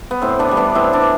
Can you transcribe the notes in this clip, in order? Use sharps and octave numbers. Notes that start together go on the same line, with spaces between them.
B3
A2 C4
B3 D4
E3 G3
B3 D4
A2 C4 E4
B3 D4
E3